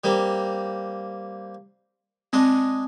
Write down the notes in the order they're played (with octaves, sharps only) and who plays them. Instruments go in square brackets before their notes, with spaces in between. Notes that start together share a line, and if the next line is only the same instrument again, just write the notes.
[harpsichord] G3 A#3 C4
[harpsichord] G#3 D4 D#5 [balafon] C4